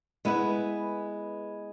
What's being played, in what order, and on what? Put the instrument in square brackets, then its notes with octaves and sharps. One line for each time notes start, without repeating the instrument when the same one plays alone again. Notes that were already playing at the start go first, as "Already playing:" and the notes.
[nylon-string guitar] G#3 B3 E4 B4